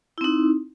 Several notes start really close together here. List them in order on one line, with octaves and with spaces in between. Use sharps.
E4 C4 D#4